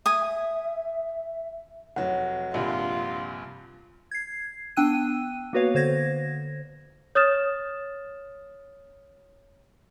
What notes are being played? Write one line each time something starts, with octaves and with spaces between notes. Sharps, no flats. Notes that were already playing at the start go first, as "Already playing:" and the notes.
E5 G#5 D#6
F1 F#3 F#5
A#1 G2 C3 F4
G#6 C7
B3 D4 G5 E6 F#6 D#7
A#3 B3 F#4 B4 C#5 F5
D3 C5 G#6 A#6
C#5 D#6 F6 A6 E7